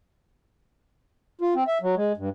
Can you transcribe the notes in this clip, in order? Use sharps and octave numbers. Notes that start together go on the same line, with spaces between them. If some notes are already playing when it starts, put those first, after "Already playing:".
F4
C4
E5
F#3
G#3
G2